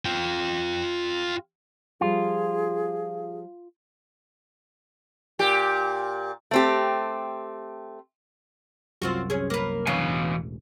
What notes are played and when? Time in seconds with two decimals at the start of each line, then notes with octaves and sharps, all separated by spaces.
0.05 F4 G5
2.01 F3 G3 F4 G#4
5.39 A#2 G4
6.51 A3 C4 G4
9.02 C2 F#2 C4 F4 F#4
9.30 C#4 G#4
9.50 A#3 B4
9.87 C#3 E3 B3 F5 G#5
10.07 E1 A1